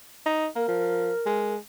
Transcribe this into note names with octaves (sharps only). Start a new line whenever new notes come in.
D#4
A#3 A#4
F3
G#3